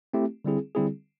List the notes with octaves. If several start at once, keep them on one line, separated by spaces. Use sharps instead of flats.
A3 C4 E4 G4
D3 G3 C4 E4 G#4
D3 G3 C4 E4 G#4